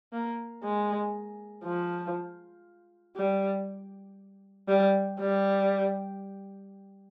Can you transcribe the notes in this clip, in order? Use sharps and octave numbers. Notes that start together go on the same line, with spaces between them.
A#3
G#3
F3
G3
G3
G3